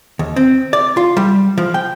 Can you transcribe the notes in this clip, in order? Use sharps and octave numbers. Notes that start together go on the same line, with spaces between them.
D#2
C4
D5
F4
G3
F3
G5